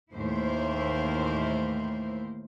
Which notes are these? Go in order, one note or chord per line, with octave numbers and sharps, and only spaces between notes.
D#2 A2 E3 A#3 E4 C5